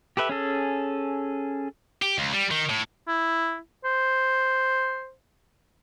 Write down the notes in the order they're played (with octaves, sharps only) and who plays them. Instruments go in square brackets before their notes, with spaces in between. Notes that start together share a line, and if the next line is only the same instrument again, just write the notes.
[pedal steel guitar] G4 A4 B4 E5
C#4 G#4 A4
[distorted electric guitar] G4
C#2
G3
D#3
A2
[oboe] E4
C5